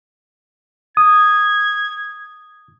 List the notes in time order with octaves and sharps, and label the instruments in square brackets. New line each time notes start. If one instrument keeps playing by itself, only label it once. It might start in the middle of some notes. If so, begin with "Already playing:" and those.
[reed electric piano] D#6 [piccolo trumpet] G#6